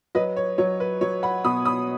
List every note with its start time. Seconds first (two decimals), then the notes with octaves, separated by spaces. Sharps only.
0.15 F#3 B4 D#5
0.36 C#5
0.58 F#3 C#5
0.80 B4
1.01 F#3 C#5
1.23 F#5 B5
1.44 B2 B5 D#6
1.65 B5 D#6